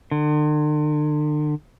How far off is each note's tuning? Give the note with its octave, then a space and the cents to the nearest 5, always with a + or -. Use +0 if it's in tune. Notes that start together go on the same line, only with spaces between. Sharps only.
D3 +40